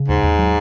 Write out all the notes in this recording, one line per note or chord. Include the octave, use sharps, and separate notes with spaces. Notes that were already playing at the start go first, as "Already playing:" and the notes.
Already playing: C#3
D#2 G#2
D#2
F#3